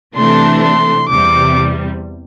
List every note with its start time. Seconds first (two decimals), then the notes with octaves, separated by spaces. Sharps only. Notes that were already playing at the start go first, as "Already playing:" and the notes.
0.16 C3 E3 A3 D4 C6
0.63 C6
1.09 E2 C3 G3 D6